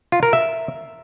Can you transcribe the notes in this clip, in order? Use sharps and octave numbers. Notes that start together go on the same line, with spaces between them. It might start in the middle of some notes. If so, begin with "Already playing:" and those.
F4
A#4
E5